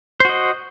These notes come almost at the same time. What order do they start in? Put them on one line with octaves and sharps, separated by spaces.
C5 F#4 D#5